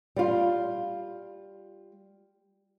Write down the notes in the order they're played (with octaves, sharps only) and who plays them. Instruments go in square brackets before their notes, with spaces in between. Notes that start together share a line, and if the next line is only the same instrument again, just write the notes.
[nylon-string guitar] G3 F4